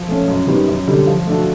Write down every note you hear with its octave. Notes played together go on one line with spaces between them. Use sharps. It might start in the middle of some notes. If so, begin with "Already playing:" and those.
Already playing: F3
A3 C#4
F#2
D#3 G3 B3
F#2
D3 G3
F3
A3 D4 F#4